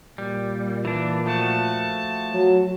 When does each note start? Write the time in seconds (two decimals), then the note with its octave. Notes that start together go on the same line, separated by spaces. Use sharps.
0.18 A#2 G3
0.85 E3 D4
1.26 F3 A3 F#4 A5
2.33 F#3